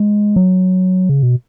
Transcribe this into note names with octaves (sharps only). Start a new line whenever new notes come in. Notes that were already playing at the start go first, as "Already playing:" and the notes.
Already playing: G#3
F#3
C#3
B2